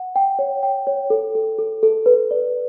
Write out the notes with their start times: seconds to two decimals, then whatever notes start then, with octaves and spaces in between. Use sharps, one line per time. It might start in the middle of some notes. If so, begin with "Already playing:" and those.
Already playing: F#5
0.16 G5
0.39 C#5
0.63 G5
0.87 C#5
1.10 A4
1.35 A4
1.58 A4
1.83 A4
2.06 B4
2.31 D5